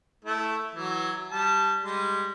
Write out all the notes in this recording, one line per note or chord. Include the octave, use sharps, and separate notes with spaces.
A3 E4
E3 F#3
G3 A5
G3 G#3